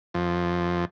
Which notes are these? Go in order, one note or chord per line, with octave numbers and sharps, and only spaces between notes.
F2